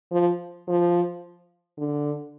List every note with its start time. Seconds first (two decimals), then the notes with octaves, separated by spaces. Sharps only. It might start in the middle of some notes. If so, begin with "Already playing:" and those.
0.12 F3
0.68 F3
1.78 D3